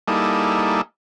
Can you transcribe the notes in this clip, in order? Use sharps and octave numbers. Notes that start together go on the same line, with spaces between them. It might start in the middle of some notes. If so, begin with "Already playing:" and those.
G3 A#3 D#4 E4 G#4 A4